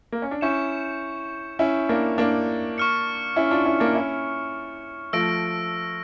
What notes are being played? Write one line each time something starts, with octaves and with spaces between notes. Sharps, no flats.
A#3
C#4
D4
C#4 E4 C#6 G6 C#7 E7
C#4 E4
A#3 D4
A#3 D4
C#6 F6 C#7
C#4 E4
D4 F4
C#4 E4
A#3 D4
C#4 E4
F3 A3 E6 A#6 D7